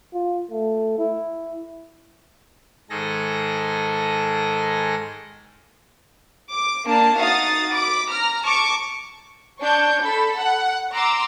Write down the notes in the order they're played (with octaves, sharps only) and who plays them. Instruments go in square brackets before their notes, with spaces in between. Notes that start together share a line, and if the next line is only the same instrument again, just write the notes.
[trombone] F4
A3
E4
[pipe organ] G#2 D#3 G#4 A4 A#6
[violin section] D6
A#3 D4 A5
D#4 F#4 F5 D#6 A6
B5 D6
A#5 F6
A5 C#6 D6
D4 C#6 G6
A4 B5
F#5
A#5 C6 D6 E6